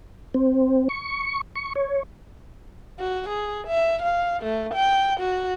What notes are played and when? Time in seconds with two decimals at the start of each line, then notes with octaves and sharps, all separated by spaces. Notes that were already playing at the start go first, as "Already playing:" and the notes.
0.34 C4
0.89 C#6
1.55 C#6
1.75 C#5
3.00 F#4
3.29 G#4
3.68 E5
4.02 F5
4.43 A3
4.74 G5
5.20 F#4